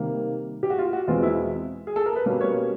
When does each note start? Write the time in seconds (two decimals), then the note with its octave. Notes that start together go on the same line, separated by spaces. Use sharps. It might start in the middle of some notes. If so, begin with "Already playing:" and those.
Already playing: C3 D#3 G3 A#3
0.63 G4
0.70 F#4
0.78 F4
0.93 F#4
1.08 E2 B2 G#3 C4 F4
1.23 E4
1.87 G#4
1.96 A4
2.06 A#4
2.16 B4
2.26 B2 G3 A#3 C#4
2.41 C#5